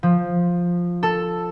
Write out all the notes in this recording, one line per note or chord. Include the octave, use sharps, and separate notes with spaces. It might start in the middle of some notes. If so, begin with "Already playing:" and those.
F3
A4